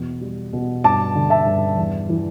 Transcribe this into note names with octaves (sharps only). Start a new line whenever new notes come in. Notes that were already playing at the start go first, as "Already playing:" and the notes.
Already playing: E2 B2
G3
B2
G2 A5 D6
D3
E5 A5
G2
E2
E3